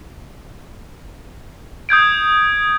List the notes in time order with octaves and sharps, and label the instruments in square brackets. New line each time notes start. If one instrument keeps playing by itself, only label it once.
[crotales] D#6 G6 G#6 D7